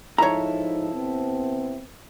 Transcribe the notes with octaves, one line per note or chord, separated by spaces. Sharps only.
G#2 F3 D#4 E4 A4 C#5 A#5
C3 B3 C4